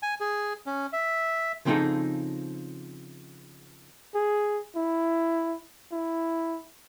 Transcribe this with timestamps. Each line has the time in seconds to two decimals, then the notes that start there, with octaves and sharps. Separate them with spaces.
0.03 G#5
0.20 G#4
0.66 C#4
0.93 E5
1.65 C#3 F3 C4 D#4 G#4 A4
4.15 G#4
4.76 E4
5.92 E4